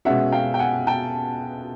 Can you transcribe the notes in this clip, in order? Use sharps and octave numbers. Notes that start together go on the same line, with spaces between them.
B2 G#3 C#4 E5 F#5
F5 G5
G5
F#5 G#5
G5 A5